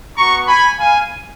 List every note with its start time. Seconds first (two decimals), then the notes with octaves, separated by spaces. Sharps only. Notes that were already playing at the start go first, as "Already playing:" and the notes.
0.17 B3 F#4 A#5 C#6
0.48 G#5 B5
0.80 F5 G#5